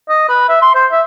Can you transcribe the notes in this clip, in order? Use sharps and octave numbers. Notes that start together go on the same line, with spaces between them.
D#5
B4
E5
C6
C5
E5